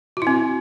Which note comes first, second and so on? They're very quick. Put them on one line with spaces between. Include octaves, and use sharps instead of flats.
F#4 E4 C4